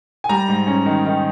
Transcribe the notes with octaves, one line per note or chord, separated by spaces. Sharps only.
G#5
G3 A#5
G#2
C#4
D#3
D#3